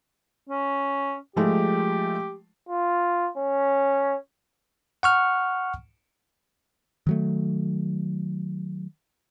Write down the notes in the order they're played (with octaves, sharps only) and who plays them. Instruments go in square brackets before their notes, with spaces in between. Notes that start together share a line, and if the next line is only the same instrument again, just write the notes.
[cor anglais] C#4
[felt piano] F3 G#3 A3 [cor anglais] G4
[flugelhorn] F4
C#4
[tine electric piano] F#5 C#6 F6
[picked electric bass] D#3 F#3 A3